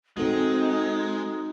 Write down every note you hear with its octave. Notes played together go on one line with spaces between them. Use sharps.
G#3 C4 D#4 F#4 A4